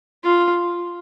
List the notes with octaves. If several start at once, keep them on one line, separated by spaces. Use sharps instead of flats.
F4